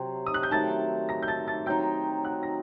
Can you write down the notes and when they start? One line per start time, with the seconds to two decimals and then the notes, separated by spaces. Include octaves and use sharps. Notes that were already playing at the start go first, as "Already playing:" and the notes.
Already playing: C3 F#3 C4
0.26 D#6
0.34 F#6
0.43 G6
0.51 D#3 F#3 A3 A5 A6
1.09 A#5 A#6
1.22 G6
1.28 A5 A6
1.48 A5 A6
1.66 F#3 C4 D#4 G5 G6
2.24 F#5 F#6
2.43 A#6